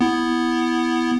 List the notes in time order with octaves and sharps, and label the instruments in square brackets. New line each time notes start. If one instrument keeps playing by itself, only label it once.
[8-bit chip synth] B3 E4